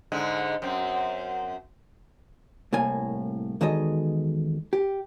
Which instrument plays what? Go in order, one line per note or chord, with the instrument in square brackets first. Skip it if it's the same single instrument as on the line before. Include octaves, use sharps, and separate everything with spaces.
[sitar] G#2 D3 G#3
F#2 C4
[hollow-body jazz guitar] C2 A2 A#3 G#5
E2 D#3 G#3 F#4 A4 D#5
G4